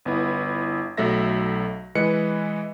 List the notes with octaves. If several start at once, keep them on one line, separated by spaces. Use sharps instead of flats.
G1 B3 E4
B1 F#3 A3 A4 E5 A#6
E3 G#3 B4 D#5 F#6 C#7